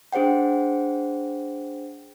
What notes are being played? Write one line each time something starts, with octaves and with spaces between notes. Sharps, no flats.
D4 G#4 C5 F#5 G5